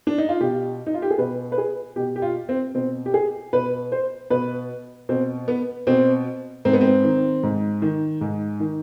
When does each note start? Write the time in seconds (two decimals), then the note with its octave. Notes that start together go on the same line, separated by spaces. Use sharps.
0.07 D4
0.18 D#4
0.29 F4
0.40 B2 G4
0.86 D#4
0.94 F4
1.02 G4
1.11 G#4
1.18 B2 B4
1.52 B4
1.58 G#4
1.96 B2 G4
2.16 G4
2.22 F4
2.49 C4
2.75 B2 C4
3.06 G4
3.14 G#4
3.53 B2 B4
3.92 C5
4.30 B2 B4
5.09 B2 C4
5.48 B3
5.87 B2 C4
6.65 G#2 C4
6.73 B3
6.81 C4
7.04 D#3
7.43 G#2
7.82 D#3
8.21 G#2
8.60 D#3